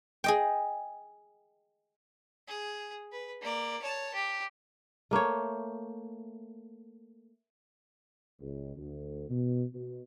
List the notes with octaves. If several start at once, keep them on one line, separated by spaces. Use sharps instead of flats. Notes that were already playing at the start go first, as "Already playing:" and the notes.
G#4 D#5 G5
G#4
B4
A#3 D5
C#5 A5
G4
A3 A#3 C5 C#5
C#2
D2
B2
B2